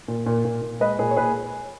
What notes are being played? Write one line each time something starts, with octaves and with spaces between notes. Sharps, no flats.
A#2
A#2
A#2
A#2
G#3 B4 D#5
A#2 G#4 B4
C#5
A#2 G#4 B4